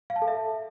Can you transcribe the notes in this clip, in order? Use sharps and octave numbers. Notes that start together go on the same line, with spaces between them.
F5
A5
A4
E5